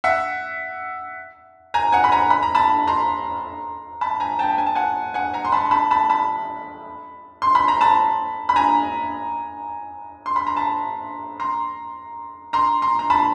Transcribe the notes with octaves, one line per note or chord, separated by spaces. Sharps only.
E5 F#5
G#5 A#5
F#5 G#5
B5
G#5 A#5
B5
A#5
A5 B5
A#5 C6
A5 B5
G#5 A#5
G5 A5
G#5
A5
F#5 G#5
F#5 G#5
G#5 A#5
C6
A5 B5
A5 B5
A5 B5
A5 B5
C6
B5
A#5
A5 B5
B5
G#5 A#5
C6
B5
A#5
A5 B5
A#5 C6
A#5 C6
A#5 C6
A#5
A5 B5